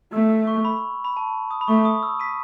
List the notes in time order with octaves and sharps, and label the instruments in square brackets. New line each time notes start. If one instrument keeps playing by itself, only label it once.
[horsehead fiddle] A3 [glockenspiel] E6
[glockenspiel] E6
C#6
B5
B5
A5
D#6
B5
[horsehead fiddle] A3 [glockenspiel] C#6
[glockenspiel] D#6
E6
B6 D#7